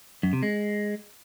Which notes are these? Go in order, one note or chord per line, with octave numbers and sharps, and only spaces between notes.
F#2
C3
G#3